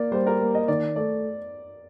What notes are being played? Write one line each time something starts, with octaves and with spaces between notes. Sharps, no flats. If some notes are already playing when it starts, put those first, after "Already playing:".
Already playing: A#3 D5
G3 C5
A#4
A#3
D#5
D#3 D5
A3 D5